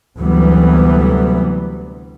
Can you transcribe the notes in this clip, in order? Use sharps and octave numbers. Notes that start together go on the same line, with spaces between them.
D2 C3 E3 F#3 G3 B3